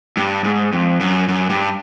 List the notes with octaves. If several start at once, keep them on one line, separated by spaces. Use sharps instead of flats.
G2
G#2
F2
F#2
F#2
G2